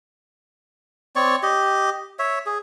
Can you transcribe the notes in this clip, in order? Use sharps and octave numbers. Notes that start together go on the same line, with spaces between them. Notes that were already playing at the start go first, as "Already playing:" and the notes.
C4 C#5 D5 C#6
G4 D#5
C#5 E5
G#4